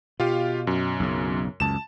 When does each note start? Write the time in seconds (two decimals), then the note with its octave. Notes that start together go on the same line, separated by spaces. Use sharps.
0.20 B2 F4 G4 F5
0.67 F#2
1.00 B1 C#3
1.60 C#2 F#2 A5 E7